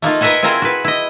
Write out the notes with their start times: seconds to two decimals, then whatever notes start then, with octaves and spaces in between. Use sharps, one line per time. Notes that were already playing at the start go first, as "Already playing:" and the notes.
0.02 A3 A#3 D#4 F4
0.21 A#4 B4 D#5 E5 F#5 G#5
0.43 C4 E4 F4 G#4 A#4 C5
0.62 F#4 B4
0.84 E4 D#5